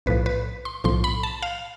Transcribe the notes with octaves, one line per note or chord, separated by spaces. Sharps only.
B1 A2 F3 B4
B4
C6
B1 A2 F3 C6
B5
A5
F5